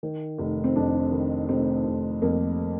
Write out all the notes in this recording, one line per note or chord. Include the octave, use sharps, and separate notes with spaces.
D#3
F1
C4
F2 D4
D#3
F1 C4
F1
F2 A#3